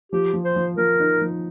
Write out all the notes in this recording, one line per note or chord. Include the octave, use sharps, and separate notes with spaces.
F3 G4
F3
C5
F3
F3 A#4
D#4
F3